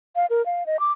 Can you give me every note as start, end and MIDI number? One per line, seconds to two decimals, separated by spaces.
0.16 0.26 77
0.30 0.44 70
0.46 0.66 77
0.66 0.80 75
0.80 0.92 86